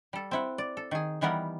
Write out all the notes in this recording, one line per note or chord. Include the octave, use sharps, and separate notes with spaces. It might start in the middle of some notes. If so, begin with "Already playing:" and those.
G3 A4
C4 E4 F#5
D5
A4
D#3 G#4
D#3 E3 G3 B3 A#4